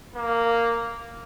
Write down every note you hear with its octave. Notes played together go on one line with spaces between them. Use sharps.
A#3